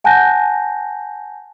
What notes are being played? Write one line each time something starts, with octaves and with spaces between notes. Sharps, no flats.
F#5 G#5 A5 F#6 G6 A#6